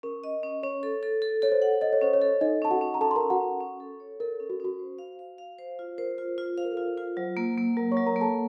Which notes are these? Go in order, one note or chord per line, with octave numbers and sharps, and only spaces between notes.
C#4 A#4
D#5
C#4
C#4 C#5
A4
A4
A4
A4 C#5
C5
F#5
A4 D#5
C#5
C#4 C5
C#5
A4
D#4 A4 D#5
C#4 A5
F#4 F#5
C#4
A#5
C#4 A4 A5
C6
C#4 A#4 A#5
F#4 F#5
C#4
C#4
A4
C#5
A4 A#4
C#4
F#4
C#4 F#4
C5
F5
F5
F5
C5
F4
A#4 C5
F4
A#4
F4
C5 F5
A#4
A4
F4 A#4
A#4
F4
F#3 C5
A#3
A#3
F#3 A#4 A#5
C#5 C#6
F#3
A#4 A#5
A#3
A4 A5